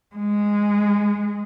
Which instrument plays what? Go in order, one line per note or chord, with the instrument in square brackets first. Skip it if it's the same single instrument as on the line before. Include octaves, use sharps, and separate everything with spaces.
[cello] G#3